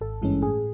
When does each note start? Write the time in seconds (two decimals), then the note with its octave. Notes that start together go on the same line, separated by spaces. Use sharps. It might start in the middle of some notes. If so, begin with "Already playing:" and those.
0.01 G#1 A4
0.22 G2 E3 G#3 C#4
0.42 A2 G#4